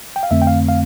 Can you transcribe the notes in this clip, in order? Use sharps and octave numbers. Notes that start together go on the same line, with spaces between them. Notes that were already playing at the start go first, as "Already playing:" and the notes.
G5
F5
F2 D3 A3 C4 E5
G5
F5
F5